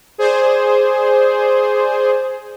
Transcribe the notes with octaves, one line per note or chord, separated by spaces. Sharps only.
G#4 C5 D5